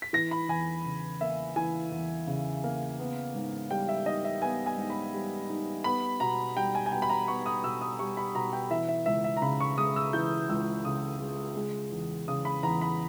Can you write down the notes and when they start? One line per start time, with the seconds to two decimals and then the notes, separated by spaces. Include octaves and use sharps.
0.02 B6
0.13 E3 A#6
0.31 B5
0.49 E2 G#5
0.85 C#3
1.21 A#3 E5
1.56 E3 G#5
1.92 E2
2.27 C#3
2.64 A#3
2.99 B3
3.35 G#2
3.71 G3 G5
3.89 E5
4.06 D#4 D#5
4.25 E5
4.42 B3 G#5
4.66 G#5
4.78 G#2
4.90 B5
5.14 G3
5.49 D#4
5.84 B3 B5
6.20 B2 A#5
6.57 G3 G5
6.75 G#5
6.86 G#5
6.92 B2 G5
7.02 B5
7.10 A#5
7.28 B3 C#6
7.46 D#6
7.64 B2 E6
7.81 D#6
7.99 G3 C#6
8.17 B5
8.35 B2 A#5
8.53 G5
8.70 E3 E5
8.89 E5
9.06 C#2 E5
9.24 E5
9.37 A#5
9.42 C#3 B5
9.60 C#6
9.78 G#3 D#6
9.96 E6
10.13 E3 G6
10.49 C#2 E6
10.85 C#3 D#6
11.21 G#3
11.56 G#3
11.92 E2
12.28 C#3 D#6
12.45 B5
12.63 E2 A#5
12.81 B5